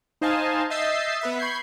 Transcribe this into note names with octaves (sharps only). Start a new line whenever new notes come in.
D#4 C5 D#5 F5 G#5 A5
D#5 E5 E6 G6 A6 C7
B3 B4 E5
B5 C#6 G6 G#6 C7